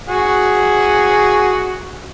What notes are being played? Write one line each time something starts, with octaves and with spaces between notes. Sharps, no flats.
F#4 G#4 F#5